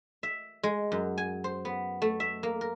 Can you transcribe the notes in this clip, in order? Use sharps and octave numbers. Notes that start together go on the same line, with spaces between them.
E5
G#3
F#2
G#5
C5
B3
A3
E5
A#3
A#4